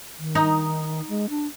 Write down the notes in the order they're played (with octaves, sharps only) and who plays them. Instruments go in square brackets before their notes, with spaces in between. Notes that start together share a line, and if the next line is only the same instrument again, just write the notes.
[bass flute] D#3
[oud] D#4
[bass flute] G#3
D4